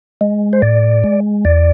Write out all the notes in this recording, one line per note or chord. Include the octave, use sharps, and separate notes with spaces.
G#3
C5
A2 D5
G#3
E2 D5